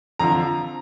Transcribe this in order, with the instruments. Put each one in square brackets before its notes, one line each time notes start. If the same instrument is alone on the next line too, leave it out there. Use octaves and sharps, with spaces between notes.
[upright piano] F2 D3 F3 A#5